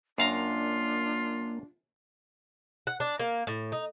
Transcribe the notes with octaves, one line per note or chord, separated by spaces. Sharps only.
F#2 A#3 D4 F4 F5 A#5
F#5
D4
A#3
A2
D#4